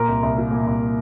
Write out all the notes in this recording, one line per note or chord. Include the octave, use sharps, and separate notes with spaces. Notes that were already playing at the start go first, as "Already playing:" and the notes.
Already playing: A#2 A#4
C2
C2
A#3
A#2
C2